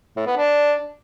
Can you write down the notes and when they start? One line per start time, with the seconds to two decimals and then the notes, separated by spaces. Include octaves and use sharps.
0.16 A2
0.27 B3
0.37 D4